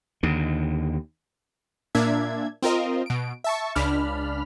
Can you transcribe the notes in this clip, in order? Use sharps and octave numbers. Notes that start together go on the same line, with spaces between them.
D#2 D3
A#2 A#3 D4 E5 G#6
C4 F4 A#4 D#5
B2 D7
E5 A5 C#6
C#2 D4 B5 F6